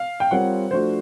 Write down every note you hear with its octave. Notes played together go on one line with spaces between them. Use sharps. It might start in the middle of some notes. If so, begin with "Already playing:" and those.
Already playing: F5
G5
G3 C4 F4 A#4 C#5 F#5
F3 A3 D4 F#4 C5